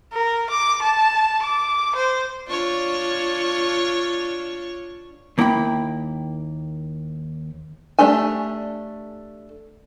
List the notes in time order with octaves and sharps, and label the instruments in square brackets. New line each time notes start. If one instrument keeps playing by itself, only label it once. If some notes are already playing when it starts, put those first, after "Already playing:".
[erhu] A#4
D6
A5
D6
C5
[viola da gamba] D4 F4 C#5
[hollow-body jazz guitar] D#2 A#3 E4 F#5 G5 B5
[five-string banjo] A3 D4 G4 A4 G#5